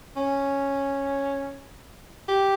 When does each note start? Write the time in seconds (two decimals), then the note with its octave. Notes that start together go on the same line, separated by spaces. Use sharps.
0.16 C#4
2.28 G4